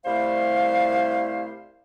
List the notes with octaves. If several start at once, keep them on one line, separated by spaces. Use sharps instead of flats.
C2 G3 A3 E4 C5 F5